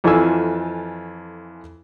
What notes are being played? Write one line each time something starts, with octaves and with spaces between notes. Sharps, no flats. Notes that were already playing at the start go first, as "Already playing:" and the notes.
F2 E3 F4 A4 G#5 E6